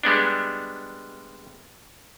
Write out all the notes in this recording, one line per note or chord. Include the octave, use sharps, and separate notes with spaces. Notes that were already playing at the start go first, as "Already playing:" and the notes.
G3 G#3 B3 D4